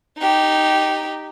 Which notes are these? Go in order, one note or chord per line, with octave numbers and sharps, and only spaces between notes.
D#4 G4